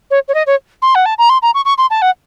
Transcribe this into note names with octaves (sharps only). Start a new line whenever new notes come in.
C#5
C#5
D#5
C#5
C6
F#5
A5
A#5
C6
A#5
C#6
C#6
C6
A5
F#5